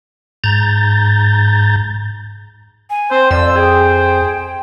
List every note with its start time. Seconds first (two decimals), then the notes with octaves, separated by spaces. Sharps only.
0.44 G#2 A#5 G6 A6
2.90 G#5
3.11 C4 C5
3.31 F2 C5 D5 E6
3.56 G#4 G5